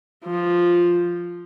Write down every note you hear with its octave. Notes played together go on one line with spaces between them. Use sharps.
F3